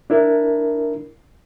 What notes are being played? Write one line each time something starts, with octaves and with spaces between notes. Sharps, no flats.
D4 E4 A#4